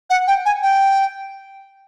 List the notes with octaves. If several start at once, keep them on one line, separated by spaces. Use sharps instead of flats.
F#5
G5
G#5
G5